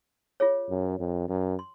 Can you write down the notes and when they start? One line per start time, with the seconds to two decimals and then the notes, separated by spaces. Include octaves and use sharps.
0.40 F4 G#4 C#5
0.70 F#2
0.99 F2
1.29 F#2
1.59 C6